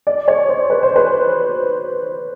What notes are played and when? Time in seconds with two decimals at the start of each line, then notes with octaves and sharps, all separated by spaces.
0.07 D5
0.28 C#5
0.49 C5
0.70 B4
0.83 C5
0.96 B4